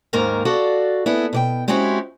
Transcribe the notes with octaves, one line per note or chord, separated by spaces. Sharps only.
D#2 G#2 D#3 A#3 A#4
F#4 A4 D5 F5
B3 E4 G#4 A4
B2 D5 G5
G#3 C4 C#4 E4 F#4 G4